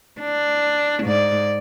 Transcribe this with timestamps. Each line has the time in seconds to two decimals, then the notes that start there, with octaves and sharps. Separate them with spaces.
0.21 D4
1.03 G#2 D5